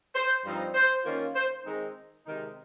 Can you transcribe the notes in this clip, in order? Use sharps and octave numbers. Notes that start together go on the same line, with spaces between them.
C5
G2 F3 C4 D#4
C5
D#3 A#3 C#4 F4
C5
D#3 G#3 C4 D#4
C3 D#3 G#3 D#4